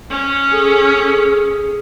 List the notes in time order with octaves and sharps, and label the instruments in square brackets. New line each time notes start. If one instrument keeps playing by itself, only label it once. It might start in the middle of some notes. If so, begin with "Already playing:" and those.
[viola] C#4
[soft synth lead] G#4 [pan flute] A4